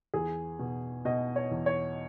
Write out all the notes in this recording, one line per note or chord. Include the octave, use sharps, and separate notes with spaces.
E2 G#4
B2
B2 D#5
C#5
E2
C#5